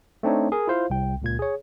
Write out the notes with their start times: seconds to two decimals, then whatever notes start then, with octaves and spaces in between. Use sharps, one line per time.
0.23 A3 C4 D4 D#4 C#5
0.52 G#4 A#4
0.67 E4 F4 C5 F5
0.90 C2 G5
1.22 C#2 A#2 G#6
1.39 G#4 C#5